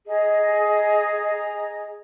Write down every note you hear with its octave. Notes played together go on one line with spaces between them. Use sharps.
G#4 D#5 A#5